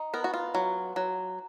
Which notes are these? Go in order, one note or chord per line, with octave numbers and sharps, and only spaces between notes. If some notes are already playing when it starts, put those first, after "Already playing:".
Already playing: D#4
B3 A#4
F#4
F4
F#3
F#3